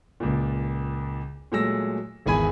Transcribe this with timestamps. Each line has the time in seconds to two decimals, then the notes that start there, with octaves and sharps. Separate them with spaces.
0.20 C#2 A#2
1.52 A#2 F#3 G#3 A3 E6 A#6
2.26 G#1 E2 G#4 G#5 B5 G#6